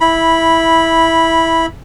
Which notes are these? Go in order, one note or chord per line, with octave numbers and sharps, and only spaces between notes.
E4 B5